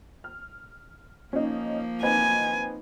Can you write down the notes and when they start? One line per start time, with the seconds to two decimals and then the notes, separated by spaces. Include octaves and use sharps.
0.24 F6
1.33 F3 A#3 C#4 D#4
2.03 C4 D#4 B4 G#5